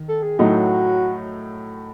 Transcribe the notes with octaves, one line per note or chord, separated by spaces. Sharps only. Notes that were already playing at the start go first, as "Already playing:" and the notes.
Already playing: D#3
A4
G#4
A2 F#3 A3 D#4 F#4